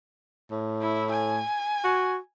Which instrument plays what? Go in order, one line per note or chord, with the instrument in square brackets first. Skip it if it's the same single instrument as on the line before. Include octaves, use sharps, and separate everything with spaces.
[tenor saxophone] A2
[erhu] E4
G#5
[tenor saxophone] F#4